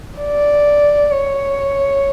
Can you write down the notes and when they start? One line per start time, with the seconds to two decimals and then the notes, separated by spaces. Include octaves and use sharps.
0.19 D5
1.11 C#5